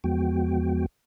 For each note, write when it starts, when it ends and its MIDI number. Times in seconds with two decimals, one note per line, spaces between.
0.04 0.86 40
0.04 0.86 53
0.04 0.86 56
0.04 0.86 59
0.04 0.86 66
0.04 0.86 79